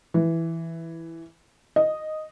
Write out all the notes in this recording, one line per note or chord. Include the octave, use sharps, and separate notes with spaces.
E3
D#5